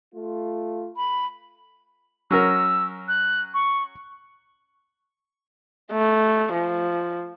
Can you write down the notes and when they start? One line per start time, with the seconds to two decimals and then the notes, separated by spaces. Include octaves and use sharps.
0.14 A3 F4
0.97 B5
2.31 F#3 C#4 A#4 E6
3.08 F#6
3.54 C#6
5.92 A3
6.53 F3